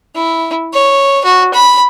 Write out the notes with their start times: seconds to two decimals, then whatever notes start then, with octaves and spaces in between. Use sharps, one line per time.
0.15 E4
0.73 C#5
1.25 F#4
1.54 B5